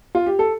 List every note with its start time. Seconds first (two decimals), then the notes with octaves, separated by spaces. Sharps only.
0.15 F4
0.26 G4
0.39 A4